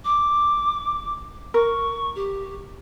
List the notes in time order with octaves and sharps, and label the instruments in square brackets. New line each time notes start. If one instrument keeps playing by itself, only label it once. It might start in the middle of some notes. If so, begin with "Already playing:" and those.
[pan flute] D6
[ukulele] A#4 [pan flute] C#6
[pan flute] G4